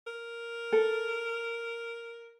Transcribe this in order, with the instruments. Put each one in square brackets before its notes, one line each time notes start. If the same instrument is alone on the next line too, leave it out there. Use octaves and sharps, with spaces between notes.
[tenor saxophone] A#4
[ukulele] A4